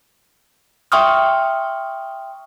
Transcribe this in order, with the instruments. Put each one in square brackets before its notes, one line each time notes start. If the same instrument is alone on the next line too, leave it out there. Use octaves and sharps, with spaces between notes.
[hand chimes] E5 G5 C6 C#6 D#6 F6